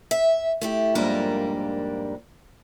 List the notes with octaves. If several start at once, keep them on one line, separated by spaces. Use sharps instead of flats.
E5
A3 E4 G4
F2 G#2 G3 A#3 D4 A#4